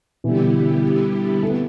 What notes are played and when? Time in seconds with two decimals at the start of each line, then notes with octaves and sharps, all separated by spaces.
0.24 B2 D3 E3 G3 B3 E4 G4
1.43 A3
1.49 B3